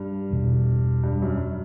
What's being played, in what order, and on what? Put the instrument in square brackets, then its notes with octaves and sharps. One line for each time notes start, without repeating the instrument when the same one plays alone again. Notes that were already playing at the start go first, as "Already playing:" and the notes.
Already playing: [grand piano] G2
[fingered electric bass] E1 E2 B2
[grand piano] G2
F#2